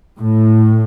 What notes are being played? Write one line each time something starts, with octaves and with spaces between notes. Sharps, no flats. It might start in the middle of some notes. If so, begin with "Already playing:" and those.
A2